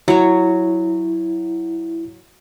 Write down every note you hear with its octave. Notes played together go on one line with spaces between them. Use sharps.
F#3 E4 C#5